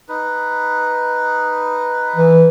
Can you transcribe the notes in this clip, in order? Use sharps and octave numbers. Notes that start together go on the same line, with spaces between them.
D#4 B4
E3